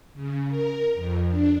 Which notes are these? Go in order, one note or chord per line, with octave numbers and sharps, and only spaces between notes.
C#3
A#4
F2
D4